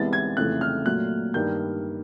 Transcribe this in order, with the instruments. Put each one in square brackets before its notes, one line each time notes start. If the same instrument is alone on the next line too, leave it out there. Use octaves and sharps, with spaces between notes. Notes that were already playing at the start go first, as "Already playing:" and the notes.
Already playing: [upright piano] C2 C3 E3 G#3 B3 A6
G#6
F2 C#3 E3 A3 F#6
F6
A#2 F#3 A3 F#6
G2 D#3 G3 A#3 G6